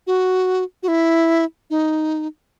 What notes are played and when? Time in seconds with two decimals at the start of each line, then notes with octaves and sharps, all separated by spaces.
0.07 F#4
0.83 F#4
0.88 E4
1.70 D#4